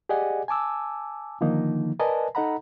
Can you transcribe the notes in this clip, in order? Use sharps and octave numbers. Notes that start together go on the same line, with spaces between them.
G4 G#4 D5 D#5 F#5 G#5
G#5 A5 D6 E6
D3 D#3 F3 A#3 D#4
A#4 B4 D5 D#5 G#5 A5
D#4 A4 D#5 F#5 A#5 B5